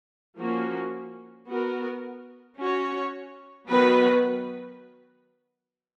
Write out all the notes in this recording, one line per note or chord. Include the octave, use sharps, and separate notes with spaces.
F3 A#3 C#4 F#4
B3 F#4 A#4
C#4 F#4 C#5
D#3 F#3 B3 F#4 B4